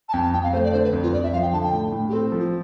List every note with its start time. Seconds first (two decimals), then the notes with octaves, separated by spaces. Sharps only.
0.09 A5
0.13 F2 G5
0.23 A5
0.33 F2 G5
0.43 F5
0.53 A3 C5
0.64 D5
0.73 D3 C5
0.84 B4
0.93 F2
1.03 F4
1.13 F2 D5
1.23 E5
1.33 F3 F5
1.42 G5
1.53 D3 A5
1.63 G5
1.73 A2
1.92 A2
2.09 G4
2.13 C4 A4
2.32 F3
2.39 F4